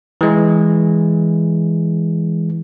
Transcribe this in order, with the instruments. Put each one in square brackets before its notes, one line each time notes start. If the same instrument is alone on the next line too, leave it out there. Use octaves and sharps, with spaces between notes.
[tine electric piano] E3 G#3